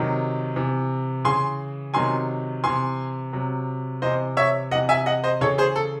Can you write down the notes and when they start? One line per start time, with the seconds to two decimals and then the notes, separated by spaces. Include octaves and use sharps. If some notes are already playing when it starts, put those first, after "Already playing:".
Already playing: C3 D#3 F#3
0.56 C3 E3
1.25 C#3 E3 G#5 C6
1.94 C3 D#3 F#3 G#5 C6
2.64 C3 E3 G#5 C6
3.33 C3 F#3
4.02 C3 E3 C5 D#5
4.37 C#5 E5
4.71 C3 D#5 F#5
4.75 E3
4.89 E5 G#5
5.06 D#5 F#5
5.24 C5 D#5
5.41 C#3 E3 A4 C#5
5.58 G#4 C5
5.76 A4